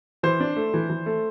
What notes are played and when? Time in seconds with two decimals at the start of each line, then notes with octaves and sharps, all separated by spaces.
0.23 E3 C5
0.40 D4
0.56 A3
0.74 E3
0.90 E3
1.06 A3